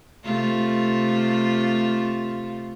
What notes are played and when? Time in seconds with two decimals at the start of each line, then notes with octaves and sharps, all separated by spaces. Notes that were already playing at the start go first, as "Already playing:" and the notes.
0.24 C3 A3 F4